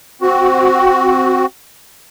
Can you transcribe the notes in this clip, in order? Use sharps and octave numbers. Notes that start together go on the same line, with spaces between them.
C4 F#4